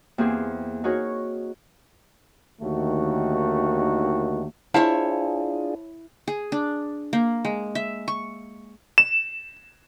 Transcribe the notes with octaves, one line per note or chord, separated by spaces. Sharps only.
E2 A#3 C4 G4 G#4 C5
D#4 F#4 G#4 A#4 C#5
D#2 D3 D#3 A3 F#4
D4 E4 F4 G#4 C5 C#5 F5 A5
G#4
D4
A#3
G#3
E5
C#6
E7